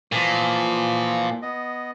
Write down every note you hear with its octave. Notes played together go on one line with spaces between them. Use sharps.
A#2 E3 F3
B3 D#5